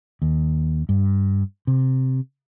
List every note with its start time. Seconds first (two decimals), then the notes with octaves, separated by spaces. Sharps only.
0.22 D#2
0.89 G2
1.67 C3